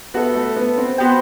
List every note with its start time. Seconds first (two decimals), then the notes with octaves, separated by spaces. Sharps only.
0.14 B3 F#4 A4 E5
0.35 A3
0.56 B3
0.78 C4
0.98 B3 F#4 C5 G5